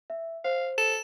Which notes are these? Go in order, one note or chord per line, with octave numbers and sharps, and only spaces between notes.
E5
C5 F5
A4 E7